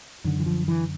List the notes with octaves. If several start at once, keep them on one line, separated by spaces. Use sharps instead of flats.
F#2 D3 D#3
E3
F3
E3